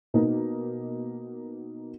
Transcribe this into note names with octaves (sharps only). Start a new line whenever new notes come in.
B2 A#3 B3 D#4